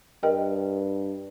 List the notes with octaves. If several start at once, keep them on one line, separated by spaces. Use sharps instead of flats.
G2 A#4 D#5 G5